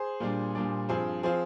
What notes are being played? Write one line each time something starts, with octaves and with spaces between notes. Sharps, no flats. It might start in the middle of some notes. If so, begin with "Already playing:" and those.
Already playing: G#4 C5
A#2 G3 D4
A#2 G3 D4
G2 F3 C4 F4 G#4 C5
F3 C4 F4 G#4 C5